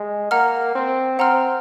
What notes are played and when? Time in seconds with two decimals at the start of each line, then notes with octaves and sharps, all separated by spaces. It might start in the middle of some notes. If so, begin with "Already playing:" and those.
Already playing: G#3
0.31 A#3 F#5 A#5 F6
0.75 C4
1.19 C4 F#5 A#5 F6